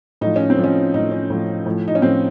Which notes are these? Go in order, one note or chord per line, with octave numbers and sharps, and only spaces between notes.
A2 F3 D#4
C#4
C4
A2 F3
C#4
A2 F3 D#4
C#4
A2 F3
A2 F3
D#4
C#4
A2 F3 C4